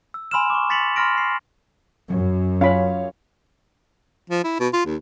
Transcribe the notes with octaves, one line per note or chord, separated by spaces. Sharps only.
E6
G#5 B5 C6 E6 F6 E7
C#6 D6
C6 A6 B6 C#7 F7 F#7
B5 C6 F6 A#6 D7
C7
F#2 F#3
C#4 F4 C#5 F5 B5
F3
E4
B2
F4
D#2